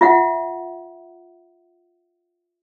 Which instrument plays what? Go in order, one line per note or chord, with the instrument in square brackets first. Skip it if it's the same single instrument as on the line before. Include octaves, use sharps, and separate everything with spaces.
[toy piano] F4 E5 F#5